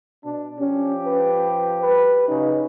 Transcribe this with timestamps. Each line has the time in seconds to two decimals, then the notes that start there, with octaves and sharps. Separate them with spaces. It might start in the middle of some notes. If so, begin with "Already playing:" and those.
0.24 B2 D4
0.59 F3 C#4 G4
1.05 B4
1.82 B4
2.28 C#3 F#3 C#4 D#4